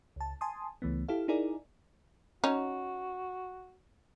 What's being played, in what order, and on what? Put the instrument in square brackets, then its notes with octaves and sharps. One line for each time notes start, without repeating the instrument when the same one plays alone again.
[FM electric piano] C#2 A5
G#5 A5 C6 D#6
C#2 E3 A3 B3
E4 G4 A4 F5
D#4 E4 G#4 A#4 D5
[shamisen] C#4 D#4 [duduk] F#4